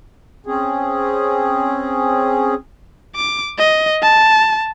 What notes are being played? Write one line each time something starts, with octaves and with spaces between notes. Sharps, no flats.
C4 C#4 G#4
D6
D#5
A5